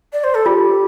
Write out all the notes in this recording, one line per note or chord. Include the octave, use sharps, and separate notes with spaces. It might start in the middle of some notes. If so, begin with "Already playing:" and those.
D5
C5
A4
F4 G4